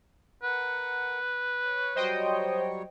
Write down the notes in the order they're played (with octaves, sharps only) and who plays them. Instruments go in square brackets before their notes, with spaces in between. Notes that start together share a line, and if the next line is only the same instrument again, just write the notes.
[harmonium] A#4 F#5 [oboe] B4
[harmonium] C#5
[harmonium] F#3 G3 C#5 [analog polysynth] C5 D#5 G5